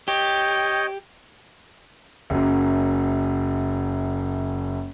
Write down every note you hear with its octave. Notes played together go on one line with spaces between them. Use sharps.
G4 C#5 D#5 G5
F#1 F#2